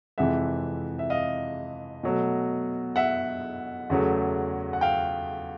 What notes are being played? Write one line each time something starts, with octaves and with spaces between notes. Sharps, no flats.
F2 C3 E3 G#3 E5 F#5
E5
D#5 F5
B2 F#3 A3
E5 F#5
E2 C#3 F#3 A3
F#5
F5 G5